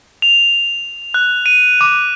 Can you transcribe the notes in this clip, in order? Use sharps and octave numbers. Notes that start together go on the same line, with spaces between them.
F7
F#6
D#7
D6